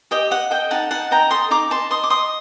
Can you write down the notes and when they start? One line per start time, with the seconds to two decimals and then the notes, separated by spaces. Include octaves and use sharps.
0.11 G4 D#5 G5
0.31 D#5 F#5
0.50 A4 D#5 G5
0.71 D#4 F#5 A5
0.91 D#4 F#5 A5
1.11 D#5 G5 A#5
1.31 A4 C6 D#6
1.50 D#4 A#5 D6
1.70 D#4 A5 C6
1.90 D#5 C6 D#6
2.03 D6
2.10 D#5 C6 D#6